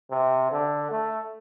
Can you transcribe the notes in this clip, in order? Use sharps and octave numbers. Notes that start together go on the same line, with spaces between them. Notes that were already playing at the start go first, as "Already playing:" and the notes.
C3
D3
A3